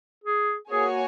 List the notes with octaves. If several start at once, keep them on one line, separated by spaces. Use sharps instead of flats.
G#4
A#3 F#4 G#4 C#5 G#5